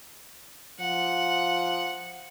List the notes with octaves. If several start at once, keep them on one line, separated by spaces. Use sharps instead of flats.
F3 F#5